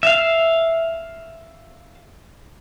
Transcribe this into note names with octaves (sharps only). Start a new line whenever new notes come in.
E5 F5